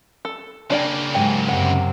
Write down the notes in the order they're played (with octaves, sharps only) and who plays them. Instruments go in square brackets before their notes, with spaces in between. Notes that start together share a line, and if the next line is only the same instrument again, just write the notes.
[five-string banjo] A4
[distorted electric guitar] C#3 A#3 [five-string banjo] D4 D5 G5
[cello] G#2 F#3 [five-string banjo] G4 G#5
[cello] F#2 C3 [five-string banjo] F#5